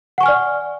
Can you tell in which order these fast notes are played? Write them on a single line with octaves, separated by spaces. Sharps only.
F#5 C#6 G#5 F6 D5